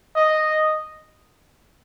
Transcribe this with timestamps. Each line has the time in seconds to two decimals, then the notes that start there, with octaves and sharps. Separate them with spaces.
0.16 D#5